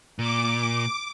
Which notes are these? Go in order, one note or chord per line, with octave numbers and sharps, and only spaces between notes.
A#2 D6